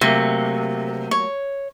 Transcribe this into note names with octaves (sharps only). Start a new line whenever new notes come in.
C3 F#3 A3 A#3
C#5